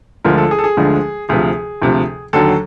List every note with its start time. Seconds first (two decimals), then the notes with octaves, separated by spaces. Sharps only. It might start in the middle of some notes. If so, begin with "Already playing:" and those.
0.24 D2 D3 F3 G#3 A#4
0.38 A4
0.51 G#4
0.59 A4
0.64 G#4
0.77 D2 D3 F3 G#3
1.29 D2 C3 F3 G#4
1.82 D2 C3 F3
2.33 D#2 D3 F#3 A4